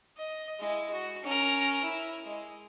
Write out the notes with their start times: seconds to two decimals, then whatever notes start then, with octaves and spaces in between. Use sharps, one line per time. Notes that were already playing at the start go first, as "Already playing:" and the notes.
0.17 D#5
0.59 G#3 E4
0.92 F#4
1.23 C#4 A#4
1.84 E4
2.24 G#3